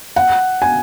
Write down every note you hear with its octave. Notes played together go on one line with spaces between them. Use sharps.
F#5
G#5